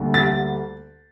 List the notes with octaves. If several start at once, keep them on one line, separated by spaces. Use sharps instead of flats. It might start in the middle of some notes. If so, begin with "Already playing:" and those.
Already playing: D2 D3 G3 A#3
A6